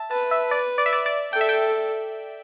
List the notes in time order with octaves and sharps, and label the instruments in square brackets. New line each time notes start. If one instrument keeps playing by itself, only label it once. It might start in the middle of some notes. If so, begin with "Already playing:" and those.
Already playing: [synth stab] E5 A5
[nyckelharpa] B4 [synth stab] A5
[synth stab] E5
D5
D5
E5
D5
D5
[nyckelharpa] A4 [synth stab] G5
[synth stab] E5
G5